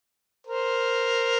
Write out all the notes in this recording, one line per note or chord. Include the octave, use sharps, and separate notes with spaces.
A#4 C5